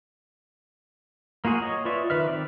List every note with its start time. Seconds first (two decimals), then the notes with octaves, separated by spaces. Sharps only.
1.45 A#3 F4 F#4 G#4
1.62 C#5 D#5
1.85 F4 B4 D5 E5 C#6
2.10 D#3 B4 E5 F6
2.28 D#3 C4 D5